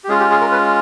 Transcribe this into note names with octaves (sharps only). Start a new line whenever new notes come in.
G4
G#3 C#4 F4 G#4
G4
G#4
A#4
B4